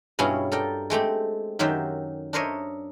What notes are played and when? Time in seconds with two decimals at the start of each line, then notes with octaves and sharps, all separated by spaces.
0.19 G2 B2 C#4 E4 F4 G#4
0.52 A4 A#4 D5 G5
0.90 G#3 A3 C4 G4
1.59 F#2 D#3 F#3 G4 C5 E5
2.33 D4 A#4 C5 C#5 D#5 E5